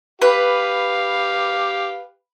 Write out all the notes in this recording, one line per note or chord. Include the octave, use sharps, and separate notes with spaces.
G4 B4 F5